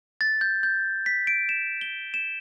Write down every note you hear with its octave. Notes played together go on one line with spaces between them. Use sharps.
A6
G6
G6
B6
D7
E7
G7
E7